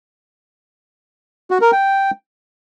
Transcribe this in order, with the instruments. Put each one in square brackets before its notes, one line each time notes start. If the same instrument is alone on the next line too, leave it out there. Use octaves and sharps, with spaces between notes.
[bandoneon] F#4
A#4
G5